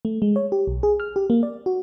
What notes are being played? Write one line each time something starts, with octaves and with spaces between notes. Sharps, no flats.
A3
G#3
C#5
G4
B1
G#4
F6
G4
A#3
D5
F#4